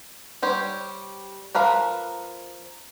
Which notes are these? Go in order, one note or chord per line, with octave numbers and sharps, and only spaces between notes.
G3 G4 C5 C#5
F3 A#4 B4 F5